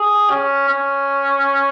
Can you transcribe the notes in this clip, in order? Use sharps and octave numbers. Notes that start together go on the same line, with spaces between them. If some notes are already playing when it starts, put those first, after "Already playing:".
Already playing: G#4
C#4
C#4